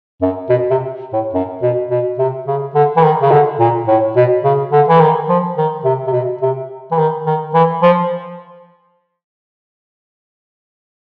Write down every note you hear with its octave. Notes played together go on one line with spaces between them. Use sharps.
F#2
B2
C3
A2
F#2
B2
B2
C3
C#3
D3
E3
D#3
C#3
D3
A#2
A2
B2
C#3
D3
E3
D#3
F3
D#3
C3
C3
B2
C3
E3
D#3
D#3
E3
F3